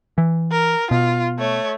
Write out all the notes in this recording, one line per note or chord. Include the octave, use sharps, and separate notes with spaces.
E3
A#4
B2 F4
A3 C#5